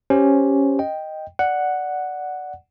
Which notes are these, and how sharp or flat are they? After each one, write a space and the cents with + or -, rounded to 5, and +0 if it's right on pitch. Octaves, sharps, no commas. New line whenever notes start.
C#4 +0 G4 +0 C5 +0
D#5 +0 G5 +0
D5 +0 F#5 +0